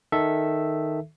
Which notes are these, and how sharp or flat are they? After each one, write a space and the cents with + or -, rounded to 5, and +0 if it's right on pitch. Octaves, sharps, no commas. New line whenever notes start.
D#3 +0 A4 +0 E5 +0